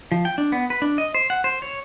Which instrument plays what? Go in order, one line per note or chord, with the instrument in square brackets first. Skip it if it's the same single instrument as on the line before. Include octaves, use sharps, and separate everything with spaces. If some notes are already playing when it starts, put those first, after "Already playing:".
[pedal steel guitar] F3
G5
D4
B3
B4
D4
D#5
C5
F#5
C5
C#5